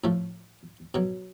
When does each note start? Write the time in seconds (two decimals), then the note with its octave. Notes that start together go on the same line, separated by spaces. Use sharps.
0.04 A2 F3 A3
0.94 B2 F#3